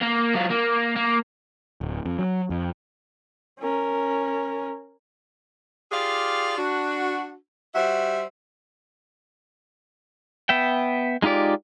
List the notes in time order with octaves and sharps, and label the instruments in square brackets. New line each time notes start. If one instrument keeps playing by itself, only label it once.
[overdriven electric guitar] A#3
F#3 F4
A#3
A#3
[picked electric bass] D1
F2
F#3
F2
[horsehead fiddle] C#4 A#4
[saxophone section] F4 G4 G#4 D5 F5
D4 F#4
G3 F#4 C5 E5
[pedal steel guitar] B3 E5 G5
G#3 D#4 F4 G4 D5